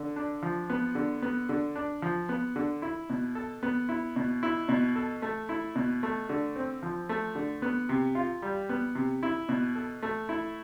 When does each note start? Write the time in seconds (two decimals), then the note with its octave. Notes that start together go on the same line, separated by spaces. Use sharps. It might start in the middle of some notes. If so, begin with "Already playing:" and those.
Already playing: D3
0.16 D4
0.42 F3
0.70 B3
0.95 D3
1.22 B3
1.49 D3
1.76 D4
2.02 F3
2.29 B3
2.56 D3
2.82 E4
3.10 B2
3.35 A4
3.63 B3
3.89 E4
4.16 B2
4.43 E4
4.69 B2
4.96 A4
5.22 A3
5.49 E4
5.76 B2
6.03 A3
6.29 D3
6.56 C4
6.83 F3
7.09 A3
7.35 D3
7.62 B3
7.89 C3
8.15 F4
8.42 G3
8.69 B3
8.95 C3
9.23 E4
9.49 B2
9.75 A4
10.03 A3
10.29 E4